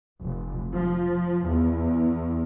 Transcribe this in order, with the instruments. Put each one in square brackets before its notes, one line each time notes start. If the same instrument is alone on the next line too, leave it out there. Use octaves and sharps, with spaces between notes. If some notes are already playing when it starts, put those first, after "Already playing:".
[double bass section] F1
F3
E2